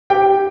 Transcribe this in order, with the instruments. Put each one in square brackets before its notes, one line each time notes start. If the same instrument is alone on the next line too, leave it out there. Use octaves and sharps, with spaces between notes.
[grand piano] G4 G5